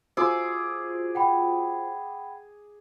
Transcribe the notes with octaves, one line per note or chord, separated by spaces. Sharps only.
F4 F#4 G#4 C5 D6 E6
F#5 G5 B5